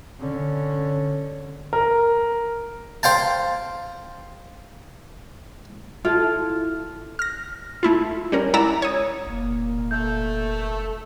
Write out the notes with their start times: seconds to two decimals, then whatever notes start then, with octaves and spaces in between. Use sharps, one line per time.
0.19 D3 C#4
1.73 A#4
3.03 C5 F5 G5 A5
6.05 E4 F4 A4
7.19 F6 A#6
7.83 A3 E4 F4
8.32 G3 C#4 A#4
8.54 G#3 E4 D5 F#5 A#5 E6
8.82 C#5 D#6
9.27 F1 A#2 A#3
9.91 A3 G6